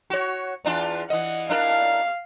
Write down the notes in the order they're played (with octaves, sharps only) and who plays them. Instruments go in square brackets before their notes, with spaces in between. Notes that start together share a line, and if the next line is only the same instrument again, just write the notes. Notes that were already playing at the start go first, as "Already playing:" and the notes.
[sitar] F#4 C#5
E2 D4 F4
[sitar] E3 D#5 [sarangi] F#5
[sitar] D4 E4 A#4 [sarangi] F5